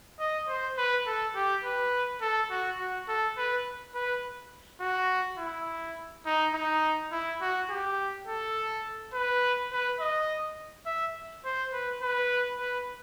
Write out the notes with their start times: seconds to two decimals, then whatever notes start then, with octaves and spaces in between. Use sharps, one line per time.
0.19 D#5
0.48 C5
0.77 B4
1.07 A4
1.35 G4
1.64 B4
2.21 A4
2.50 F#4
2.79 F#4
3.08 A4
3.37 B4
3.95 B4
4.80 F#4
5.38 E4
6.26 D#4
6.54 D#4
7.12 E4
7.41 F#4
7.69 G4
8.28 A4
9.14 B4
9.72 B4
10.00 D#5
10.86 E5
11.45 C5
11.73 B4
12.02 B4
12.59 B4